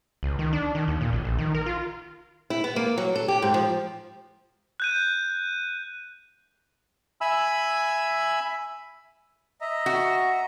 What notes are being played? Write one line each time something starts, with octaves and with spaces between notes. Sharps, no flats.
C#2
D#3
D4
D#3
D#2
A#2
A1
A#1
D#3
A#4
F4
E4
B3
A#3
F#3
A4
G4
G#2
F3
F#6 G6 D#7
E5 G#5 B5 E6
D#5 E5 A#5
F#4